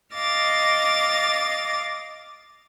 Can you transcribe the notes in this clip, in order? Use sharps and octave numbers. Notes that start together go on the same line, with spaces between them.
D#5 F5 D6 A6 A#6